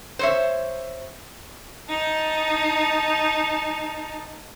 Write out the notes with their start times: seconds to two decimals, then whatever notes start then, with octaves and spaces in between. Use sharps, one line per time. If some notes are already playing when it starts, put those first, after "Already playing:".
0.19 C5 C#5 E5
1.89 D#4 A5